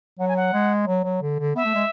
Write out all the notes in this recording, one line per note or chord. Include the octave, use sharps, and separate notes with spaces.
F#3 F#5
G#5
F#5
G#3
F#3
F#3
D3
D3
B3 E5
A3
G#3